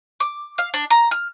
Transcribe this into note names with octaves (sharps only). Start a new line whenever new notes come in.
D6
F5
D4
A#5
F6